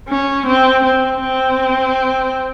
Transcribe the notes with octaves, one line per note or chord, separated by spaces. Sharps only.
C#4
C4
C4
C4